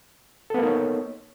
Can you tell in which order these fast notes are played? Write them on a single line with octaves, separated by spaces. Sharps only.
A4 B3 A#3 D#4 C#5